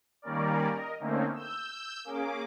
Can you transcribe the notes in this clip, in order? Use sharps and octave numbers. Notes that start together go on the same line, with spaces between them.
D#3 G3 A#3 C#4 A#4 D5
A#4 D#5
D3 A3 A#3 C4 C#4 D#4
E6 G6
A#3 C#4 G#4 D6